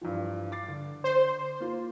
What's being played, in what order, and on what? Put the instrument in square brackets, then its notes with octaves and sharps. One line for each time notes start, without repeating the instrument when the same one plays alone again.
[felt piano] G2 E3 F3
D6 A6 C7
D3
[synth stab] C5
[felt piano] A#3 F4